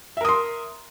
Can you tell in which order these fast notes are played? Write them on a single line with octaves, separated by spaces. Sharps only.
E5 A#4 D#6 C6